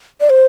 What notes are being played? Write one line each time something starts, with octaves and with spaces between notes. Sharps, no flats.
D5
C5